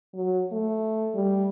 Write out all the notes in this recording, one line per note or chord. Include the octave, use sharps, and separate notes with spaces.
F#3
A3
G3